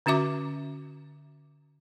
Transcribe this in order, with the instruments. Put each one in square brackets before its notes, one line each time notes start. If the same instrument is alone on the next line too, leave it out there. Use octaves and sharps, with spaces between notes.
[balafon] D3 C#4 F#4 E5 D6